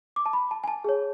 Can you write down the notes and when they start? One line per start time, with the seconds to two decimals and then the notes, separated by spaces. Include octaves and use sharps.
0.16 D6
0.26 A5
0.33 B5
0.51 A5
0.64 G#5
0.68 A5
0.84 G#4 C#5